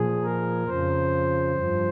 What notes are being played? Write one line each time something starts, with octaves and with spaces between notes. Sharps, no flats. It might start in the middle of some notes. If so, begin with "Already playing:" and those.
Already playing: A#2 F3 G#4
A#4
F2 C#3 F3 C5
G2 F3